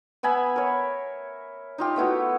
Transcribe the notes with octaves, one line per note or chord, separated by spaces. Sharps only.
B3 E5 G#5 B5
A#4 C#5
D#4 F4 G4
A3 B3 E4 F#4